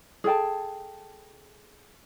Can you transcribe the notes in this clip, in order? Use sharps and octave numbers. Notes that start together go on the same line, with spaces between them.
G#4 A4 G5 A5